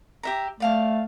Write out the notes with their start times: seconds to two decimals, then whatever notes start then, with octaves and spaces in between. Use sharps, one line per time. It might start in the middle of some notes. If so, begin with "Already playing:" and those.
0.23 G4 E5 A#5
0.60 A3 D5 F5 A5